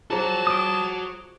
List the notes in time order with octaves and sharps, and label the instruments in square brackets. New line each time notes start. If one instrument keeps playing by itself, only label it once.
[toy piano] F4 G#4 C5 [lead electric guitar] F#4 A#5 [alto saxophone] A5
[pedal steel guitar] D6 D#6